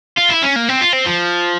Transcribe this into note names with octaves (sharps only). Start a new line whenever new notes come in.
F4
E4
C#4
A#3
C4
F4
C4
F3